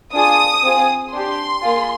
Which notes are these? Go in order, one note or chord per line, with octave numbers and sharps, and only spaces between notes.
D4 F4 G#4 D#6
C4 F4 G#4
D4 G4 C6
A#3 F4 G#4